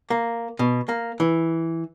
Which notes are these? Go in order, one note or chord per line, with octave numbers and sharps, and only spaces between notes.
A#3
B2
A#3
E3